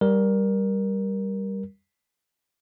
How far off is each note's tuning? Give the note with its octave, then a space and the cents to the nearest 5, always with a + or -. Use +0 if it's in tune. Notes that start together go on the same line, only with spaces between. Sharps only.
G3 +0 A#4 +15